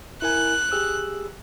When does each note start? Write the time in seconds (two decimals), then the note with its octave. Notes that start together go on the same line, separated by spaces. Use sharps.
0.22 E4 A#4 G#5 F#6
0.72 G4 G#4 E6